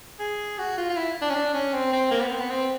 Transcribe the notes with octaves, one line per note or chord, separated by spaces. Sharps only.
G#4
F#4
F4
F4
E4
D4
C#4
D4
C#4
C4
C4
A#3
B3
C4
B3
C4